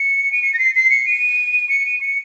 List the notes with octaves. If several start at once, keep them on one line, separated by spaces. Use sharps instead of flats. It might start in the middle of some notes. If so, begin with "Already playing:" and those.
Already playing: C#7
D#7
C#7
A#6
C7
C7
C#7
D#7
C#7
D#7
C#7